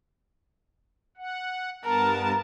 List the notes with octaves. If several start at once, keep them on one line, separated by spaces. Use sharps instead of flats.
F#5
G2 B3 A#4 A5